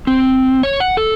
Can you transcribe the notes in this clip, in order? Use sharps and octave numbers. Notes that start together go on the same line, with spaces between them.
C4
C#5
F#5
A4